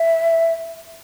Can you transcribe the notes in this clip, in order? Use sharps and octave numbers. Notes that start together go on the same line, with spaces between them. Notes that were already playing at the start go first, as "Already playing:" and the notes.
Already playing: E5